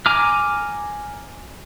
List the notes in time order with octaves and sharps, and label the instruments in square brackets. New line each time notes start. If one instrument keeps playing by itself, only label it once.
[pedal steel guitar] G#5 A#5 D6 F6